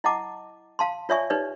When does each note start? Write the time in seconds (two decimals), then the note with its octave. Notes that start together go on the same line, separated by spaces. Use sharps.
0.04 E4 D#5 F#5 A5 D6
0.79 F5 A5 C6
1.09 F4 C#5 D5 E5 G#5 C#6
1.30 D#4 G4 B4 C#5 D5